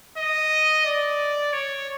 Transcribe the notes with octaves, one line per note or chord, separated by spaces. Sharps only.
D#5
D5
C#5